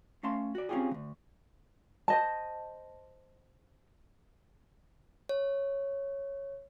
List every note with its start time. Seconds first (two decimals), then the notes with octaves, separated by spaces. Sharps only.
0.23 A3 C#4 F5 A5 C6
0.55 F#4 D5
0.69 C4 C#4 D#4 F4 G4 G#4
0.91 D2 E3
2.08 C5 D#5 A5
5.29 C#5